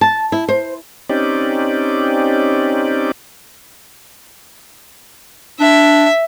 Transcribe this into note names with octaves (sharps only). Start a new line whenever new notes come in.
A5
E4
C5
C4 C#4 D#4 G4 D5
D4 E5